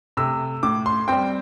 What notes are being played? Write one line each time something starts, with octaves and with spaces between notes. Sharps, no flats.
C3 A3 E6
A2 D6
C6
G3 C4 G5